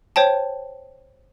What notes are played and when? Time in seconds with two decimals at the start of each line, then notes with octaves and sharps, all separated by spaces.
0.16 C5 C#5 G5 A5